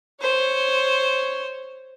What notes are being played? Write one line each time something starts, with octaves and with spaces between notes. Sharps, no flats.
C5 C#5